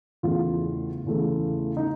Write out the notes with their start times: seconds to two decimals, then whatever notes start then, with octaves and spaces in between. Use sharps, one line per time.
0.23 E2 C#3 E3 A3 F4
1.05 E2 C#3 E3 A3
1.77 D#4